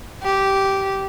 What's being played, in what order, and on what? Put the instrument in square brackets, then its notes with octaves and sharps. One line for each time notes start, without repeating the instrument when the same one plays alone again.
[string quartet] G4